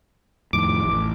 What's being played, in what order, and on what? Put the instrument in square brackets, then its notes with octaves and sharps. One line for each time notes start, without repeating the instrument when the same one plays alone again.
[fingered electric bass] F2 A2 D#3 [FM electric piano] D6
[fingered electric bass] A1